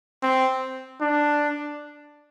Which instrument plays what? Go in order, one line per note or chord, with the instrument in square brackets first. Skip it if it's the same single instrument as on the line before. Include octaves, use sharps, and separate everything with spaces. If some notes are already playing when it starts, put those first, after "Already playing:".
[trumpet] C4
D4